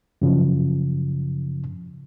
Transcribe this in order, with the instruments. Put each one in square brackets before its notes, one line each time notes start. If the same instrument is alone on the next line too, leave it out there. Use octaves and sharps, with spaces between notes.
[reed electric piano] F#2 C#3 F3